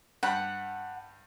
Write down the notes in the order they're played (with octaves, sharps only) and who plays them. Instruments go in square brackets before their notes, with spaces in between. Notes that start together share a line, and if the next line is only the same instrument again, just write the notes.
[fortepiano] G2 G5 B5 [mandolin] F#5